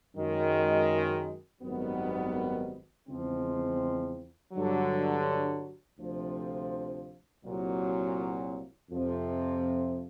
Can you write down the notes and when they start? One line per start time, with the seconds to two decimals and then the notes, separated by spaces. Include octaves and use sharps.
0.15 F#2 D#3 G#3
1.61 G#1 F#2 D#3 G3 B3
3.07 E2 C#3 F3 G#3 C4
4.53 G2 D3 F#3
5.99 D2 C3 F3
7.45 C2 A#2 F#3
8.90 F2 C3 F3